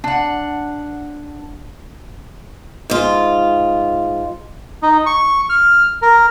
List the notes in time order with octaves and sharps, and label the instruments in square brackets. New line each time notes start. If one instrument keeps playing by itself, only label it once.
[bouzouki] D4 F#5
[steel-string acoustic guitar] G#2 F4
[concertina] D#4
C#6
F6
A#4